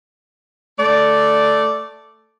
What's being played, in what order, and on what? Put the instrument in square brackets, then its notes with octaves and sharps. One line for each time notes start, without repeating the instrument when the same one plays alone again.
[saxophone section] A3 D5